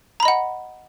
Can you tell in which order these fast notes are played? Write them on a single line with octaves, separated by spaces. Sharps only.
A#5 B5 D#5 F#5